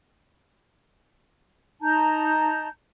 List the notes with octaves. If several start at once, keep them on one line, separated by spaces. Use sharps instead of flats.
D#4 A5 A#5 G6